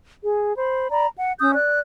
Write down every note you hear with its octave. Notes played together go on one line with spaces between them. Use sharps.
G#4
C5 B5
D5 A#5 B5
F#5
C#4 D#6 E6 G6
D5 F#6